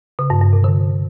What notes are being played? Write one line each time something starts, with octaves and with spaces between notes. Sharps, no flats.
C#3
G2
G2
C3
D3